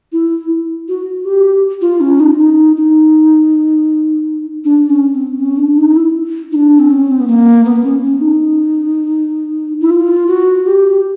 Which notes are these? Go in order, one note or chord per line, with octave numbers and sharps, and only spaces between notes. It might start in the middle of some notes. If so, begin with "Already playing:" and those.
E4
F#4
G4
F4
C#4
D#4
D#4
D#4
D4
C#4
C4
C#4
D4
D#4
E4
D#4
D4
C4
C#4
C4
B3
A#3
B3
C#4
C#4
D#4
E4
F4
F#4
G4